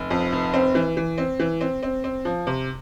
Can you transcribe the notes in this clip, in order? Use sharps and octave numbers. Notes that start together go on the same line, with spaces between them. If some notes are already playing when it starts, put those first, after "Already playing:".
Already playing: F1
F2
F1
C4
E3
E3
C4
E3
C4
C4
C4
F3
C3